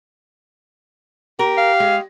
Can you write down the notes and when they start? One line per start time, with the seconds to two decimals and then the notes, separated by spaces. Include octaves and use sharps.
1.39 G4 A#4
1.58 F5
1.80 G#3